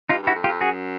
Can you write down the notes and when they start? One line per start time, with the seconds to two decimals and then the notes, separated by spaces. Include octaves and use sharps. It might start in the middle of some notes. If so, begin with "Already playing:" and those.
0.09 G2 D#4 F4
0.23 G2 E4 F#4
0.35 F2
0.44 F4 G4
0.48 F2
0.61 F#2 F#4 G#4